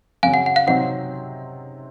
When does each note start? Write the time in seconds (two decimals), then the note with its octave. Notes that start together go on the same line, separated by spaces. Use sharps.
0.23 F#2 C#3 F#3 F5 G#5
0.34 F#5
0.46 F#5
0.56 F5
0.67 C3 F#3 C4 D#4 F#5